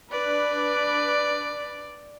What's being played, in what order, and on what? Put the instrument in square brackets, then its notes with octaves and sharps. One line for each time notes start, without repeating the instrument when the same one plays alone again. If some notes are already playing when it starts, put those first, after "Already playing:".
[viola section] D4 B4 [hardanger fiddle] D5